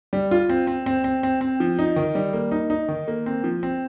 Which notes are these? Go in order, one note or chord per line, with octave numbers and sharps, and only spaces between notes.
G3
F4
C4
C4
C4
C4
C4
C4
F3
D#4
D#3
G3
A#3
D#4
D#4
D#3
A#3
C4
F3
C4